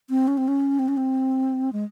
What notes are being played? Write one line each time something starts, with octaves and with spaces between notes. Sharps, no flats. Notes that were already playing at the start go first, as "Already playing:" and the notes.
C4
C#4
C4
C#4
C4
C#4
C4
G#3